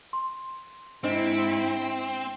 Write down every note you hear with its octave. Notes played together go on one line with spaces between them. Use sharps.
C6
G#2 C4 D4 E4 C5 D#5